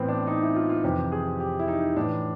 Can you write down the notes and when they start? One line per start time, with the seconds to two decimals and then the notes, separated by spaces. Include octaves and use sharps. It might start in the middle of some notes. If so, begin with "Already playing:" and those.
Already playing: A2 E3 B3 C4
0.08 D4
0.27 D#4
0.42 E4
0.56 F4
0.70 F4
0.84 F2 C3 E3 G4
1.12 G#4
1.40 G4
1.59 E4
1.68 D#4
1.97 A2 E3 D4